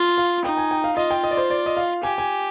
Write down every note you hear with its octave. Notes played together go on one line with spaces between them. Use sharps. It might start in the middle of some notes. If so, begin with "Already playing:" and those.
Already playing: F4
F5
D#4 G5
G#5
G5
F5
F4 D#5
G5
D#5
D5
C5
D5
D#5
F5
G4 G#5
G#5